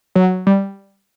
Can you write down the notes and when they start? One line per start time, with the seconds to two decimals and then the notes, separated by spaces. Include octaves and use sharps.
0.15 F#3
0.47 G3